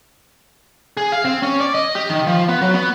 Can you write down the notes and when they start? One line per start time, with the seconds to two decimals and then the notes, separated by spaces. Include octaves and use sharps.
0.97 G#4
1.12 F5
1.25 C4
1.42 C#4
1.60 D5
1.75 D#5
1.95 G4
2.09 D#3
2.27 F3
2.49 B3
2.61 F#3
2.74 B3